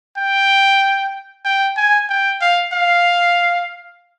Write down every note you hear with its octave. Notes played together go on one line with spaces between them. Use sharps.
G5
G5
G#5
G5
F5
F5